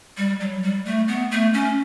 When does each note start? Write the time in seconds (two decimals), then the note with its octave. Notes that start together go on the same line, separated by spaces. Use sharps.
0.17 G3
0.40 F#3
0.63 G3
0.85 A3
1.08 B3
1.31 A3
1.54 C#4